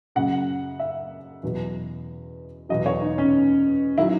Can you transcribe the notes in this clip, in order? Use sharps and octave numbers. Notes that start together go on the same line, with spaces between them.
F#2 C#3 F#3 F#5
E5
E2 B2 F#3
E2 B2 F#3 D#5
C#5
D#4
C#4
D#3 F#3 E4